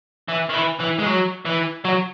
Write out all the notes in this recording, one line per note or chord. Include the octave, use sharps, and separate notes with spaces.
E3
D#3
E3
E3
G#3
F#3
E3
F#3